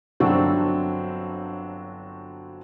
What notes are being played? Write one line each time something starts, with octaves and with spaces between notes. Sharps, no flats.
G1 F#3 C4 D4 F#4 E6